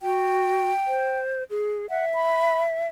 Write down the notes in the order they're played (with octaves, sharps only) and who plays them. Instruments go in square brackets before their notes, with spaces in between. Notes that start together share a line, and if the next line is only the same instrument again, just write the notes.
[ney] F#4 [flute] G5
[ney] C5
G#4
[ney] E5 [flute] F#5
[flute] B5